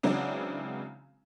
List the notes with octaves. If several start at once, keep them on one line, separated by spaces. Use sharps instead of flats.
C#3 E3 F#3 G#3 C4 D4